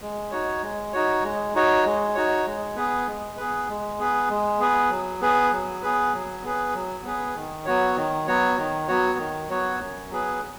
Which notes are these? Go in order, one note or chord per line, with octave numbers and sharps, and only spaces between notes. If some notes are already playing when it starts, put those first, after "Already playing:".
G#3
D#4 F#4 C#5
G#3
D#4 F#4 C#5
G#3
D#4 F#4 C#5
G#3
D#4 F#4 C#5
G#3
B3 G#4 B4
G#3
B3 G#4 B4
G#3
B3 G#4 B4
G#3
B3 G#4 B4
F#3
B3 G#4 B4
F#3
B3 G#4 B4
F#3
B3 G#4 B4
F#3
B3 G#4 B4
D#3
F#3 B3 F#4 C#5
D#3
F#3 B3 F#4 C#5
D#3
F#3 B3 F#4 C#5
D#3
F#3 B3 F#4 C#5
F#2
F#3 B3 G#4 B4